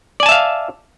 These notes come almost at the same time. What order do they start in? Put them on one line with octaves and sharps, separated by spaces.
D5 G#5 A5 E5 F5